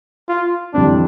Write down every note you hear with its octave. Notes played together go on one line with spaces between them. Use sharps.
F4
F2 E3 G3 C4 D4